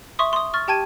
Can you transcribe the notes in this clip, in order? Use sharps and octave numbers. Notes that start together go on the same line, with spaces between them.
E5 C6 C#6 D#6
C6 D#6
C#6 F6 A6
G4 G5 A5 G#6 D#7